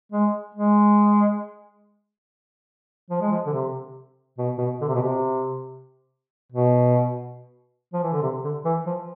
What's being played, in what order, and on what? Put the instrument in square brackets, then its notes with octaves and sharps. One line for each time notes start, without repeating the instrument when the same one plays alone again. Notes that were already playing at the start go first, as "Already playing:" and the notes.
[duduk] G#3
G#3
F3
G#3
F3
D3
C3
B2
B2
D3
C3
B2
C3
B2
F3
E3
D3
C3
D3
E3
F3